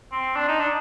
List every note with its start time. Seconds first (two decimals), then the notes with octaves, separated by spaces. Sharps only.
0.12 C4
0.36 D4
0.48 D#4
0.59 D4